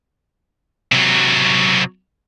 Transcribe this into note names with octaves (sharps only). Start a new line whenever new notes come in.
C3 F#3